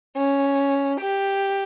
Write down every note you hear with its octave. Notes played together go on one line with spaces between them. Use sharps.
C#4
G4